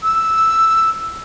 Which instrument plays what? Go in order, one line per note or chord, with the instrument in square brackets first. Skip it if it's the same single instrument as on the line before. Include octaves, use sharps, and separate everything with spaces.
[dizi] E6